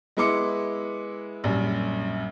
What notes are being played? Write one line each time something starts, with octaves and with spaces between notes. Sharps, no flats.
G#3 B3 E4 C6 D6 C#7
A#1 F#2 G3